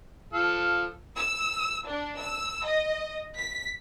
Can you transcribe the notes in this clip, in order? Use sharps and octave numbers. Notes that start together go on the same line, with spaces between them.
F3 A4 F5
E6
D4
E6
D#5
B6